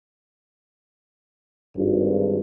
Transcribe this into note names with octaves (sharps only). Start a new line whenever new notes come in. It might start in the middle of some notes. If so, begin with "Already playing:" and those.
G#1 G2